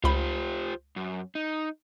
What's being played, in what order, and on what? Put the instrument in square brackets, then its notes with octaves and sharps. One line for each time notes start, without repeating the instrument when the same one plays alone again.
[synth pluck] C#2 B5 [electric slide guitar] F4 G4 C5
[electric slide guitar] F#2
D#4